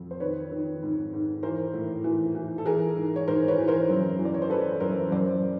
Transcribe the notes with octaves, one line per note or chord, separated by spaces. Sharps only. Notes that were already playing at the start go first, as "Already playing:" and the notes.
Already playing: F2
C5
D#3 B4 C#5
D#3
G#2
G#2
E3 A#4 C5
A2
E3
E3
A4
E3 G#4 A#4
G#2
C#5
G#2 A#4 C5
B4 C#5
E3
A#4 C5
F#2
E3
D5
C#5
C5
E3 A4 B4
F#2 A#4 C5
F#2 C5 D5